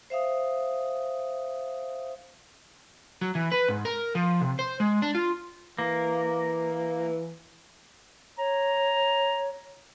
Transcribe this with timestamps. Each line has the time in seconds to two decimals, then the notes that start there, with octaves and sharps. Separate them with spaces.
0.10 C5 E5 F5 D#6
3.22 F#3
3.35 E3
3.52 B4
3.68 G#2
3.85 A#4
4.15 F3
4.41 C3
4.59 C5
4.80 G#3
5.02 D4
5.15 F4
5.79 E3 A#3
8.38 C#5 A#5